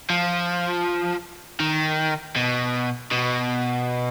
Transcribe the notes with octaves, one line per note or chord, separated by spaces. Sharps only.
F3
D#3
B2
B2